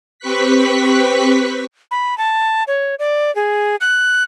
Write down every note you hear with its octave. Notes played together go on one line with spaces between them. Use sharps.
C4 G4 B4 C#6 F#6 B6
B5
A5
C#5
D5
G#4
F#6